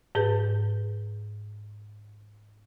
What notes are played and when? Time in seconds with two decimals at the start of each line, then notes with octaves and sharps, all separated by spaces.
0.15 G#2 G#4 B4 G6